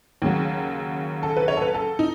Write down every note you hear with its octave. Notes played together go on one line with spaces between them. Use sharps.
D#2 C#3 F#3
A4
B4
C#5
A4
B4
A4
D#4